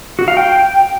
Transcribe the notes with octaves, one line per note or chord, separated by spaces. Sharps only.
F#4
F5
G5